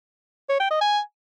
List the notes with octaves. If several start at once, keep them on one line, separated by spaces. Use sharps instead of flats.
C#5
G5
D#5
G#5